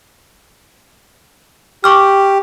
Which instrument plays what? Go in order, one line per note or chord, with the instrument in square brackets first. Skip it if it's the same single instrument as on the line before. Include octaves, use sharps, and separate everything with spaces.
[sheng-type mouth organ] G4 [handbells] C#6 D6 F6